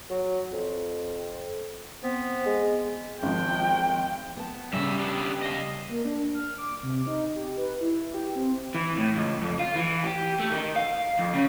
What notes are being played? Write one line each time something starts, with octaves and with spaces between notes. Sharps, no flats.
F#3
F2
B3 C4
G#3
G#1 F3 G5
B3 A5
G2 C#3 G3 E5
B3 D4 G4
D#5 F5
A#3
D4
F6
D6
C3
D#4
G4
B4
E4
G4
C4
E3
A2
C#2
F2
F4
E3
G4
A3
D#3
F5
F2
C#3